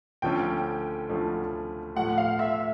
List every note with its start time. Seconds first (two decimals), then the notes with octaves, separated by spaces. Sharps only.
0.22 D2 D3 F3 A3 C#4 G5
1.09 D2 D3 F3 A3 C#4
1.96 A2 F3 A3 F#5
2.18 F5
2.39 E5